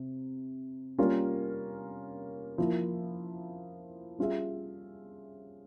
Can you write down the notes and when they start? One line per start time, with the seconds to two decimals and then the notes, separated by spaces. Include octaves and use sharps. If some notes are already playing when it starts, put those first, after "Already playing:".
Already playing: C3
0.98 G3 A#3 C#4 F4 A#4
2.58 F3 A#3 E4
4.18 G3 C#4 F4 G#4 E5